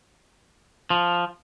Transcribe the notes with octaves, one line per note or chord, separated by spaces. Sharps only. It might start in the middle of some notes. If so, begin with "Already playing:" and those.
F3